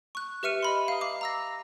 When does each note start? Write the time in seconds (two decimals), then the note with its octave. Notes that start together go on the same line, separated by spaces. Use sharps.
0.15 C#6 F#6
0.43 G4 B4 E5 F6 C#7 D#7
0.63 D#5 B5 C6
0.88 F5 A#5 D#6
1.01 F5 D6
1.21 A#5 E6 A#6